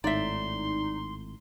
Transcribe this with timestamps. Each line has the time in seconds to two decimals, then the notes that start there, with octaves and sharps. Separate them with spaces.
0.04 G#1 A2 D#4 D5 E5 C6